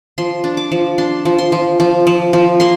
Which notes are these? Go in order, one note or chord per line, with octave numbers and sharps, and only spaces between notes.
F3 C6
D4
D6
F3
D4 C6
F3
C6
F3
F3
F3
F3
A#3 C6